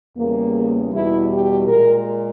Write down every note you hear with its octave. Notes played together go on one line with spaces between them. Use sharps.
E2 C#3 G3 A#3
E2 B2 G3 E4
G4
A#2 G#3 A#4